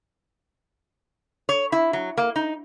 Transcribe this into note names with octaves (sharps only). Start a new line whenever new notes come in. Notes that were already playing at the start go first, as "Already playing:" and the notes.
C#5
E4
F#3
A#3
D#4